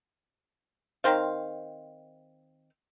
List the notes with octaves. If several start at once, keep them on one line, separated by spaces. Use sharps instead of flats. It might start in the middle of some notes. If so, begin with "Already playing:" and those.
D#3 C4 C5 F5